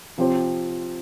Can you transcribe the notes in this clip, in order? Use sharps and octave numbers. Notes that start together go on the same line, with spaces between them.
C3 F3 C4 G4 C5